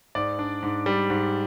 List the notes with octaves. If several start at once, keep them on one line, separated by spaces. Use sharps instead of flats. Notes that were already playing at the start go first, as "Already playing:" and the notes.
G#2 D5
D4
G#2
G3
G#2